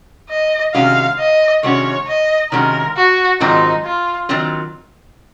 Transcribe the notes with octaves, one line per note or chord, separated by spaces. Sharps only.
D#5
C3 D#3 G#3 C#4 F#4 F5
D#5
C3 D#3 G#3 C#4 F#4 C#5
D#5
C3 D#3 G#3 C#4 F#4 A#4
F#4
G#2 D#3 F#3 C4 D#4 F4
F4
D#3 F#3 C4 F4